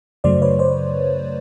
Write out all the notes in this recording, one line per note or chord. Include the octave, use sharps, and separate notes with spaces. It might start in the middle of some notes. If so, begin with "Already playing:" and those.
F#2 C#3 F#3 A3 C5 D5
B4 C#5
C5 D5